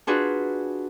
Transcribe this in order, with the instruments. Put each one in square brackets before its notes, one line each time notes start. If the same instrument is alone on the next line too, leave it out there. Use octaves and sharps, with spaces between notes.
[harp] D4 F4 F#4 G#4 B4